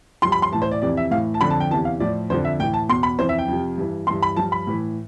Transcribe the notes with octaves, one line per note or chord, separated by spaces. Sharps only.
G2 F3 C6
B5
C6
A2 E3 A5
C5
D5
F2 C3 E3 D5
E5
A2 E3 F5
A5
F2 D3 F3 B5
A5
G5
E2 C3 E3 A5
F5
A2 F3 D5
F2 D3 F3 C5
E5
A2 E3 G5
A5
E2 B2 C6
B5
F2 E3 C5
E5
G5
F2 C3 F3
G2 E3
G2 E3 C6
B5
G2 F3 A5
B5
A2 E3